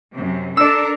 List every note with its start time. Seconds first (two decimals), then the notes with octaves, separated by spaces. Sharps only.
0.13 F#2 C3
0.57 D4 A4 A#4 D5 E6